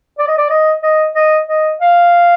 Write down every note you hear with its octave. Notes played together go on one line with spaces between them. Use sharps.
D5
D#5
D5
D#5
D#5
D#5
D#5
F5